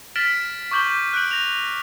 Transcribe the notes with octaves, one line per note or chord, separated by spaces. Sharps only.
F6 A6 B6 D7 E7 F#7
C#6 D6 G6 F#7 G7
F#6 G6 D7 F#7
A#6 F7